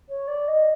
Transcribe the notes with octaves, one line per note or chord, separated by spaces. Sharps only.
C#5
D5
D#5